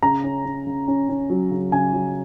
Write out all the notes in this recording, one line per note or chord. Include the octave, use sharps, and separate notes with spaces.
C#3 A#5
C#4
C#4
C#3
C#4
C#4
F#3
C#3
C#3 G#5
F#3